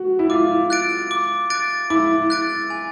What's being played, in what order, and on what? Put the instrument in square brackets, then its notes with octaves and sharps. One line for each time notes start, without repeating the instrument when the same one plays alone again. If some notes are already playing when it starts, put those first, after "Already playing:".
Already playing: [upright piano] F#4
E4
[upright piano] F4 [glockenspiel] D6
[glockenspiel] F#6 A6 D7
D6
F#6 A6 D7
[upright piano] E4 [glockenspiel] D6
[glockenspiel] F#6 A6 D7
G#5